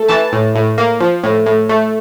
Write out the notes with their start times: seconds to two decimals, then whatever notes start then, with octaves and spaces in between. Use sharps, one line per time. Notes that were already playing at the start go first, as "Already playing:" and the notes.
Already playing: A3
0.08 E3 A5
0.33 A2
0.55 A2
0.78 A#3
1.00 F3
1.24 A2
1.46 A2
1.69 A3